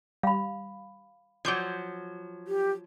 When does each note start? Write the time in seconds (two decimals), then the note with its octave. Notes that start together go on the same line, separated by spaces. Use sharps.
0.23 G3 F5 B5
1.45 F3 F#3 D6 G6 G#6
2.48 G4